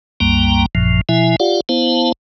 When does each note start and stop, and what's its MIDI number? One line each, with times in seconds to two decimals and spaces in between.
0.20 0.66 36
0.20 0.66 42
0.20 0.66 55
0.20 0.66 58
0.20 0.66 79
0.20 0.66 82
0.75 1.01 33
0.75 1.01 42
0.75 1.01 46
0.75 1.01 53
1.09 1.36 47
1.09 1.36 53
1.09 1.36 64
1.09 1.36 76
1.09 1.36 80
1.40 1.60 65
1.40 1.60 67
1.40 1.60 74
1.40 1.60 77
1.40 1.60 78
1.69 2.12 59
1.69 2.12 64
1.69 2.12 72
1.69 2.12 77
1.69 2.12 81